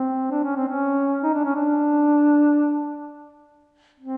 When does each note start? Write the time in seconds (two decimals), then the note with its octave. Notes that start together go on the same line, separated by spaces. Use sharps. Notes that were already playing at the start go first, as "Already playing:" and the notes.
Already playing: C4
0.31 D4
0.44 C#4
0.56 C4
0.68 C#4
1.24 D#4
1.34 D4
1.45 C#4
1.56 D4
4.00 C4